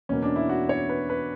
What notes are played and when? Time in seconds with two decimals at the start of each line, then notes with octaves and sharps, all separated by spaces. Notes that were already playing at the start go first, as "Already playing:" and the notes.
0.09 E2 B2 A#3 C#4
0.23 D4
0.36 E4
0.49 F#4
0.69 C#5
0.89 B4
1.10 B4